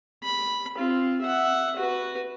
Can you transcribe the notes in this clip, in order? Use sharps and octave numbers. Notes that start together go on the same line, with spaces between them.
B5
C4 F4
E5 F#5
F#4 B4